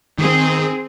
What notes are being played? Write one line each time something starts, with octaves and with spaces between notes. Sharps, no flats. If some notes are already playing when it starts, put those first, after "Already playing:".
D#3 C4 G#4